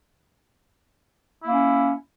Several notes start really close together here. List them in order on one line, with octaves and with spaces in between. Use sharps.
E4 A#3 C#4